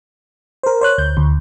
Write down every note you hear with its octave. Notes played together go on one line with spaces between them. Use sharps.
A#4 C5
C5 C#5 F#6
D2 G6
D2